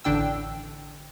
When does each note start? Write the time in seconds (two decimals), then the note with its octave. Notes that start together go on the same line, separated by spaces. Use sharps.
0.04 A1 D3 D4 G5 E6